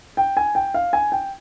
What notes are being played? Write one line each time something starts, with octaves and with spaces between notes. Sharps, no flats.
G5
G#5
G5
F5
G#5
G5